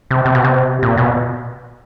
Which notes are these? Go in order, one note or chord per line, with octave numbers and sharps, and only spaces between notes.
C3
C3
B2
C3
A#2
B2